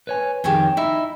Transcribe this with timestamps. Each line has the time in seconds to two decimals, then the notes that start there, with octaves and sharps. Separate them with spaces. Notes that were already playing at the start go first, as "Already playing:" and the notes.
0.07 B4 C#5 G#5
0.44 F2 D#3 G4 G#4 C#5
0.77 D#4 E4 E5